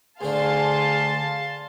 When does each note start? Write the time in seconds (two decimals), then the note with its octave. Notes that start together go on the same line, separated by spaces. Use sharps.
0.21 D2 D3 D4 G#4 F5 A5 C6